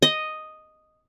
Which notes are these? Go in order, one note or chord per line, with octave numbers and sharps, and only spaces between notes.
D#5